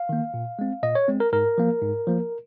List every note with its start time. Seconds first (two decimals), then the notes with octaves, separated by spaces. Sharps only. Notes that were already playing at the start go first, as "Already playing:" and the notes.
Already playing: F5
0.09 D#3 A#3
0.34 A#2
0.59 G#3 C4
0.83 A#2 D#5
0.95 C#5
1.08 G#3 C4
1.20 A#4
1.33 G#2 A#4
1.58 F3 A#3
1.82 G#2
2.07 F3 A#3